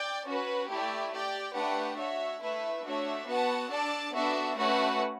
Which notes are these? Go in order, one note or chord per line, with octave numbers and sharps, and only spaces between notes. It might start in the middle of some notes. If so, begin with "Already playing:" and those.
Already playing: D5 G5
C#4 F#4 B4
A3 E4 G4 D5
G4 D5 G5
A3 D4 G4 B4 F#5
F#4 C#5 E5
A3 E4 B4 E5
A3 D4 F#4 C#5 E5
B3 F#4 B4 F#5 A5
D4 A4 D5 A5
B3 D4 F#4 A4 E5
A3 C#4 F#4 B4 F#5